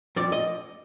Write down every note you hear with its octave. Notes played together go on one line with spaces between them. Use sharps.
F2 D5
D#5